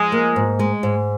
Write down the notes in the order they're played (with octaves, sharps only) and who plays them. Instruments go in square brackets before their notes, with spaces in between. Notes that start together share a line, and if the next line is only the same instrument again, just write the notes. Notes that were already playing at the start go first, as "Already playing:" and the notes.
Already playing: [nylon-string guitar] F3 [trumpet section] G#3
[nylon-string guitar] A#3
G#2
G#3
G#2